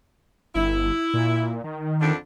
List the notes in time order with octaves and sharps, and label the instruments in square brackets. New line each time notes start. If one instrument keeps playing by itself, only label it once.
[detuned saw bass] G1 [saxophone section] E4
[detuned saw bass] A#2
D#3
[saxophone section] F2 D3 D4